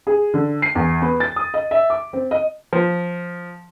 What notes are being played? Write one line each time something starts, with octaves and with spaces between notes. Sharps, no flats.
G#4
D3
C7
E2
B3
A6
D#6
D#5
E5
D6
C4
D#5
F3